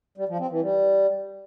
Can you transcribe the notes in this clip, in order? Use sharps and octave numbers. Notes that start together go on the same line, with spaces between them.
G3
F3
C4
E3
G3